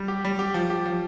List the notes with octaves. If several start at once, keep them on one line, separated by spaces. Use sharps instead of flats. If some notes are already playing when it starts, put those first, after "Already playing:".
Already playing: G3
G4
G3
G4
F3
G4
F3